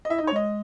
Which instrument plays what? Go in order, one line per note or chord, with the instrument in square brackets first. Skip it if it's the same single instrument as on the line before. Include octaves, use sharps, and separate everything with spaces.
[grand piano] D#5
[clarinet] E4 [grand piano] E5
[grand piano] D#5
[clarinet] D#4
[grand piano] C#5
[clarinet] G#3 [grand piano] D#5